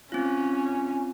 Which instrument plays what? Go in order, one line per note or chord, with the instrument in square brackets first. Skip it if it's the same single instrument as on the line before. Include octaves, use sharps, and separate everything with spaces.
[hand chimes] C4 F4 [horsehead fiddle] C#4